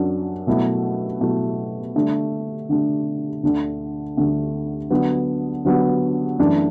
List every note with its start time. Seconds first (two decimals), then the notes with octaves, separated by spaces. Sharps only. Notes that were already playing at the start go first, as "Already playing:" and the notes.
Already playing: F#2 F#3 D4
0.47 B2 F#3 A3 E4
1.21 B2 F#3 A3 E4
1.95 D3 A3 D4
2.69 D3 A3 D4
3.43 D2 D3 A3
4.17 D2 D3 A3
4.90 D3 F#3 B3
5.65 D3 F#3 B3
6.38 F#2 E3 A3 D4